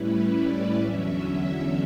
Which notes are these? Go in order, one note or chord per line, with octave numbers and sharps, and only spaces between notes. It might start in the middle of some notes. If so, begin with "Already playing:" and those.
Already playing: A2 G3 C#4 E4 B4
D5
E2 D3 F#3 C#4 E5
E5